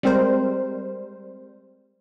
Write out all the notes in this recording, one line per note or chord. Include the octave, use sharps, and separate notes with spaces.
G3 G#3 C4 A#4 C5